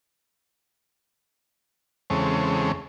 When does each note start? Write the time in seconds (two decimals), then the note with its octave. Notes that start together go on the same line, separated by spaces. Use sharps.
2.10 E2 C#3 G#3 C4 A4 C#5